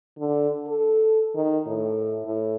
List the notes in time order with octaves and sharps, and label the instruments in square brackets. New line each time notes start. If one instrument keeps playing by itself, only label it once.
[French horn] D3
A4
D#3
A2
A2